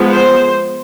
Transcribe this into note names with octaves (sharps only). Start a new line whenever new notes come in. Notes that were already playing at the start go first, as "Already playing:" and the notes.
Already playing: F3 G#3 B3
C5